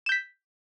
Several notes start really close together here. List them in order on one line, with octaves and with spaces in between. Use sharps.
E7 G6 B6